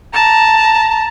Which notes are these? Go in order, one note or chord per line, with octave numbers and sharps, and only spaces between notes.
A5 A#5